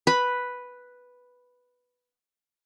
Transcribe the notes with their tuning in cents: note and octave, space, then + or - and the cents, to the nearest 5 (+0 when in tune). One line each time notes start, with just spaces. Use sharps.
B4 +0 B5 +0